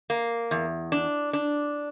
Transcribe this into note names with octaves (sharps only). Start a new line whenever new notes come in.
A#3
E2
D4
D4